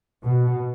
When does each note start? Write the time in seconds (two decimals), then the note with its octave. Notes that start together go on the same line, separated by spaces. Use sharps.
0.24 B2